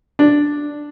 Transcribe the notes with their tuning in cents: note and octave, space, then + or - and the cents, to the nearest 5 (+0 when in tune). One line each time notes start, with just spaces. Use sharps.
D4 +0